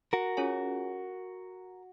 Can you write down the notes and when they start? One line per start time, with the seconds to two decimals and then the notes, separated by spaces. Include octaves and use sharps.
0.13 F#4 A#4
0.37 C#4 F4 G#4 C#5 G#5